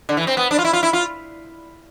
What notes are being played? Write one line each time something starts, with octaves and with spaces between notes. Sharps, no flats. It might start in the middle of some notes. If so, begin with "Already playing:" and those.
D3
E3
C4
B3
D4
F4
E4
F4
E4
F4